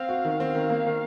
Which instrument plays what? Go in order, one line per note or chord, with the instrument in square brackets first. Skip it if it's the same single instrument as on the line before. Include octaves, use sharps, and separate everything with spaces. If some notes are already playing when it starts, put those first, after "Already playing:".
Already playing: [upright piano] C4 [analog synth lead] F5
[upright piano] F#4
D#3
C4
D#3
A#3
D#3